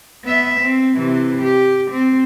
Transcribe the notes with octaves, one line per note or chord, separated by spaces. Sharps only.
B3 E5
C4
C3 E3
G4
C4